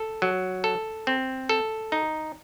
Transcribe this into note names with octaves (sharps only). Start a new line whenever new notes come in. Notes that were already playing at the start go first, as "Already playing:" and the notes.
Already playing: A4
F#3
A4
C4
A4
D#4